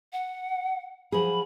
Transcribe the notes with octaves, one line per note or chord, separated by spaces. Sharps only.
F#5
F3 F#3 G#4 B5